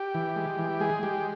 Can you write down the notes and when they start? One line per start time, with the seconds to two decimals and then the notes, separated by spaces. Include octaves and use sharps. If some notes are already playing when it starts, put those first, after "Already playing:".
Already playing: G4
0.15 E3
0.36 G#3
0.59 E3
0.80 G#3 G#4
1.03 G#3 G4